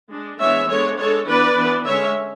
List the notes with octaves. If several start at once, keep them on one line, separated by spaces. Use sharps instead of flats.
G#3 D4
E3 G#3 B3 D4 C#5 E5
G#3 B3 D4 A4 C#5
G#3 D4 A4 C#5
E3 B3 D4 B4 D5
E3 B3 D4
D3 G#3 C#4 C#5 E5